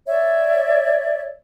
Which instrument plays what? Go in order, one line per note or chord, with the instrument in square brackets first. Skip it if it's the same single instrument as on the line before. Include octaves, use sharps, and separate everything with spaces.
[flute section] C#5 D5 E5